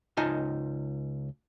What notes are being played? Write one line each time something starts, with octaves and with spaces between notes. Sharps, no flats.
C#2 D#4 F4 D#5 G#5 A5